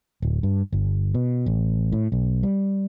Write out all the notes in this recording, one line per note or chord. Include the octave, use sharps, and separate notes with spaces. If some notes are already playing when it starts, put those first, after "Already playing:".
D1
G2
G1
B2
A1
A2
B1
G3